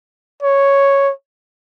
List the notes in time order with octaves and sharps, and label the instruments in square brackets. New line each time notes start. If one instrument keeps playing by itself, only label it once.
[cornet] C#5